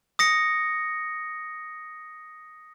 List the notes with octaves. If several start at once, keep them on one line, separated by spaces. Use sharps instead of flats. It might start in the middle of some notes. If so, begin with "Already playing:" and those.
D#6 A#6 C#7